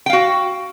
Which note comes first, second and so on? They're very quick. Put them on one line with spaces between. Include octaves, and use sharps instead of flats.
G5 F5 F#4